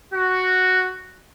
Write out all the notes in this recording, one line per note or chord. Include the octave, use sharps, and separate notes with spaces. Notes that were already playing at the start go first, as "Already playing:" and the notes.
F#4